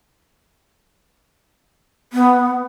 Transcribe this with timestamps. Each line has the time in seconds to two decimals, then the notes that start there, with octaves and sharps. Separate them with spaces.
2.13 B3